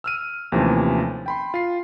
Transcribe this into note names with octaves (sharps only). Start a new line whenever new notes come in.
E6 F6 D#7
D#2 C3 E3 F3 A3 C#4
G5 B5 C6
F4 C7